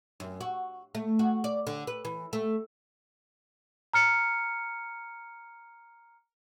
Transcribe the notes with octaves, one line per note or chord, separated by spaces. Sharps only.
F#2
F#4
A3
F#4
D5
D3
B4
E3
A3
A#5 F6 C#7